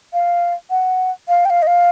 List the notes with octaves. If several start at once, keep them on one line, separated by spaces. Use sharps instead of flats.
F5
F#5
F5
G5
F5
D#5
F5